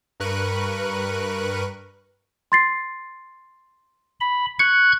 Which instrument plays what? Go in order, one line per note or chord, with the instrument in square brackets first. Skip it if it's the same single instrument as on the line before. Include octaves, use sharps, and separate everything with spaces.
[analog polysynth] G2 A#4 B4 C#6 F#6 D#7
[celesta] C6 A6 C7
[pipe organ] B5
[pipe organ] C#6 F#6 G#6 [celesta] C#7